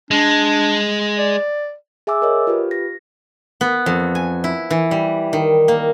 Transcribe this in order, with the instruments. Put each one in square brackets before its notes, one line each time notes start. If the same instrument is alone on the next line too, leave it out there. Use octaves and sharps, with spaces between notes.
[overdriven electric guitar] G#3 [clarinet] D4
[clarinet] D5
[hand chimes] G#4 E5 G#5 D6 E6
A#4 C#5 D#5
F4 G4 B4
A#6
[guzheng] B3
F2
G#5
E4
E3
G3
D#3
A#3